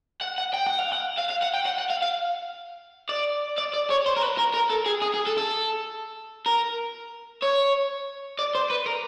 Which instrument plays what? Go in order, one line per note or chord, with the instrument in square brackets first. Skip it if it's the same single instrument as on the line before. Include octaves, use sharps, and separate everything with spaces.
[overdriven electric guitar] F#5
F#5
G5
F#5
F5
F#5
F5
F5
F#5
G5
F#5
F#5
F5
F5
D5
D5
D5
C#5
C5
A#4
B4
A#4
A#4
A4
G#4
G#4
G#4
A4
A4
A#4
C#5
D5
C5
B4
A#4